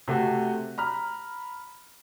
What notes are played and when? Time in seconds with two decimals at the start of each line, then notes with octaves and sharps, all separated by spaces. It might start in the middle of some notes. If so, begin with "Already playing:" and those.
0.08 C3 A3 F#4
0.78 A#5 B5 F6